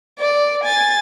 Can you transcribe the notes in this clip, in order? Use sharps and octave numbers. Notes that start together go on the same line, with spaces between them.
D5
G#5 A6